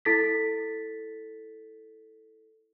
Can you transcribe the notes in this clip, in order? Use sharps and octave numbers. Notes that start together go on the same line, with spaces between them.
E4 A4 A6 B6